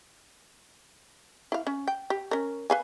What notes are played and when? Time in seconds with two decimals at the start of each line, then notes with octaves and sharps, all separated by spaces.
1.52 E4 F5
1.67 C#4
1.88 G5
2.10 G4
2.31 C#4 A#4
2.70 B4 F5 G#5